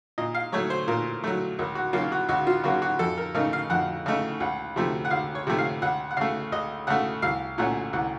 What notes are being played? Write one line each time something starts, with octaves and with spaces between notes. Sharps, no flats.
A#2 D#5
F5
F#3 A3 C#5
C5
A#2 A#4
F#3 A3
C#2 A#4
F#4
C#3 F#3 A#3 F4
F#4
C#2 F#4
F4
C#3 F#3 A#3 F#4
F#4
F2 A4
A#4
C#3 A3 D#4 A#4
F5
F2 F#5
C#3 A3 D#4
C#2 F#5
C3 F3 A3
F#5
C#2 F5
C#5
C3 F3 A3
F5
C#2 F#5
F#5
C#3 A3 F5
C#2 D#5
C#3 A3 F#5
C2 F5
A#2 A3 C#4 F#5
C2 F#5